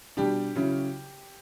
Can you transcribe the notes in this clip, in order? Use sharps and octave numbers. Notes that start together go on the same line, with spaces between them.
B2 G3 D4 G4
C#3 F#3 C#4 E4